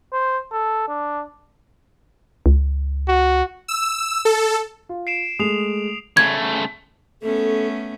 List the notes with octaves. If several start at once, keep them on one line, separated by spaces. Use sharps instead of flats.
C5
A4
D4
C#2
F#4
E6
A4
F4
C7 D7 E7
G#3 A3 D#6 C7 F7
C#3 A3 G#6
A3 B3 C#4 A4